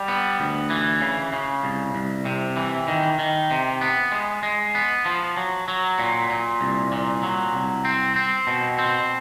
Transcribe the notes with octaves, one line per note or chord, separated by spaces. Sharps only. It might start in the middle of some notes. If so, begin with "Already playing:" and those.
Already playing: G3
B3
D2
E3
C#3
C#3
C2
C2
C3
E3
D#3
D#3
C3
B3
G#3
G#3
B3
F3
F#3
F#3
A#2
A#2
C2
A#2
F#3
C2
C4
C4
B2
C4